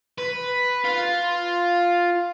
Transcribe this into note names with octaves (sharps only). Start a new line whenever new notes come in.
B4
F4